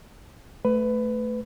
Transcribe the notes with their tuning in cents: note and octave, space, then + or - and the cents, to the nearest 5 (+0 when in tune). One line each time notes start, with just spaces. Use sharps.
A3 +0 B4 +20